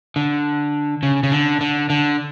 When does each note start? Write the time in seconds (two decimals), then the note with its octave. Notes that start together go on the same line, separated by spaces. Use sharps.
0.16 D3
1.03 C#3
1.23 C#3
1.31 D3
1.61 D3
1.90 D3